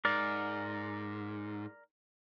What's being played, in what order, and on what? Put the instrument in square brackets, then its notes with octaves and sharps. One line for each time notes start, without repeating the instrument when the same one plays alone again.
[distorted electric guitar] G#2 [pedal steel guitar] A#4 D5